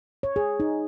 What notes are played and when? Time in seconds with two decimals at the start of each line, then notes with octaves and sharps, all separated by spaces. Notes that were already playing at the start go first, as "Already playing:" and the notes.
0.23 C#5
0.36 G#4
0.60 D#4